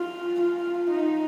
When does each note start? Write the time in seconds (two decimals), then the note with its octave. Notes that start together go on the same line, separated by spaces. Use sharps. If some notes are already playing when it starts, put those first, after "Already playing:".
Already playing: F4
0.41 F4
0.89 D#4